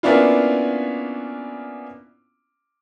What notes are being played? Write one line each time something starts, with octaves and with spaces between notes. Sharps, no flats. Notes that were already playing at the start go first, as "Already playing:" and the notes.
A#3 B3 C#4 D4 E4 F4